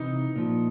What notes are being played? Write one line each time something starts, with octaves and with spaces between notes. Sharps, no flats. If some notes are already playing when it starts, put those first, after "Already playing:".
Already playing: C3 E3 D#4
A#2 F3